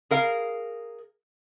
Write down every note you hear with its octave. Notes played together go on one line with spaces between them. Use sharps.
G#4 A#4 F5